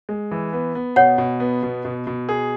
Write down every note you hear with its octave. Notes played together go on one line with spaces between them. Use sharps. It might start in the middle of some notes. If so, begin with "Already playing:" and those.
G#3
E3
B3
B3
B2 C#5 F#5
B2
B3
B2
B2
B2
G#4